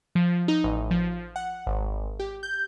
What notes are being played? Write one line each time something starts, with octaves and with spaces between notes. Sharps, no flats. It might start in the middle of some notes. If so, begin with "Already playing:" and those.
F3
D#4
A1
F3
F#5
G#1
G4
G6